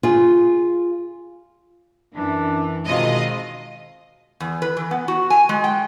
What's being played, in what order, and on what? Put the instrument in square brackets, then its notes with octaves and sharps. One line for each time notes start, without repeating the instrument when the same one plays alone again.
[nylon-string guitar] F4 G#4
[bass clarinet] F#2 [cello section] E3 [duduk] D4
[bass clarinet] B2 [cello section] D#3 C4 F4 [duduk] G#3 [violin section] D#5
[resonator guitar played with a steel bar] E2
B4
E3
B3
F#4
G#5
G#3
G5